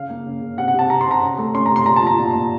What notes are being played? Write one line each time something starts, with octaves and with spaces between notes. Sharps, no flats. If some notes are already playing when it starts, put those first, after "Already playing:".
Already playing: C#3 F5
A#3
C#3
C#3
C3 F#5
F#5
C3 A5
C3 A#5
C6
C3 A#5
C#4
A3
C#4 C6
A#5
C3
C6
A#2 A#5
A5
F3 A#5
A#2
A#2